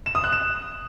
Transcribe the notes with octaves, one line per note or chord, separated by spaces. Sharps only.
E7
D#6
F#6
E7